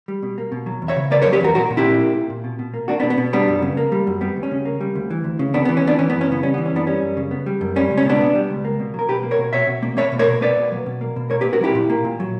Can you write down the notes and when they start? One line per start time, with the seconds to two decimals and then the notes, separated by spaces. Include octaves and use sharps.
0.08 G3
0.23 B2
0.38 A#3
0.52 B2
0.66 F#3
0.82 E2
0.88 C#5 E5
0.96 C#3
1.11 A#3 B4 D5
1.22 A#4 C#5
1.26 F#3
1.33 G4 B4
1.41 E2 F#4 A#4
1.55 A#2 F#4 A#4
1.70 A#2
1.77 E4 G4
1.85 A#3
2.00 A#3
2.15 A#2
2.30 A#2
2.44 B2
2.59 B2
2.74 A#3
2.88 A#3 D4 F#4
3.00 B3 D4
3.03 B2
3.10 B3
3.18 B2
3.33 G3 B3 D4
3.48 F#2
3.62 C#3
3.77 A#3
3.92 G3
4.07 F#2
4.21 G3 B3
4.37 D2
4.43 C#4
4.51 C#3
4.65 A#3
4.81 G3
4.95 D2
5.10 E3
5.24 D2
5.39 C#3
5.54 D2 B3 D4
5.65 B3
5.69 E3
5.77 C#4
5.83 D2 B3 D4
5.99 E3 C#4
6.10 B3
6.14 F#2
6.21 C#4
6.29 C#3 B3
6.43 G3 C#4
6.54 B3
6.58 E3
6.65 C#4
6.73 F#2 B3 D4
6.87 G3 C#4
7.01 F#2
7.17 C#3
7.31 B3
7.46 G3
7.61 F#2
7.76 G3 C#4
7.91 C#2
7.97 C#4
8.05 B2 B3 D4
8.21 B3
8.35 G3
8.50 C#2
8.65 A#3
8.79 B2
8.94 F#3 A#4
9.09 B2 G4 B4
9.23 A#3
9.31 A#4 C#5
9.38 B2
9.53 B2 C#5 E5
9.67 B2
9.83 A#3
9.97 A#3 C#5 E5
10.12 B2
10.19 A#4 C#5
10.28 B2
10.41 A#3 B4 D5
10.57 B2
10.72 F#3
10.86 B2
11.01 A#3
11.16 B2
11.30 A#3 A#4 C#5
11.41 G4 B4
11.45 A#2
11.53 F#4 A#4
11.60 F#3 E4 G4
11.75 A#2
11.90 A#3
12.05 A#2
12.20 F#3